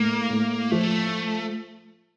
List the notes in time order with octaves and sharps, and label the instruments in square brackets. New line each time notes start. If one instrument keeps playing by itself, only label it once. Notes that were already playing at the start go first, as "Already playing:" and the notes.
Already playing: [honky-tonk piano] A2 [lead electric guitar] A#3
[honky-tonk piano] A2
[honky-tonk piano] F3 [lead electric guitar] A3